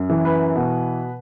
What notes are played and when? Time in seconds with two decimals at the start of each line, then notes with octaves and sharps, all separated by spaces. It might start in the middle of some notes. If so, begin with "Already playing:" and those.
Already playing: F#2
0.09 E3
0.25 B4
0.55 B2